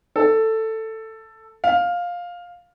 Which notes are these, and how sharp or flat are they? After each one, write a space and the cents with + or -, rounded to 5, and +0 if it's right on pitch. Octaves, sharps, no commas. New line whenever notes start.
A4 +10
F5 +10